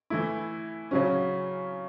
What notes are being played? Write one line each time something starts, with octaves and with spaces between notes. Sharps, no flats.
E3 A3 E4
C#3 F#3 C#4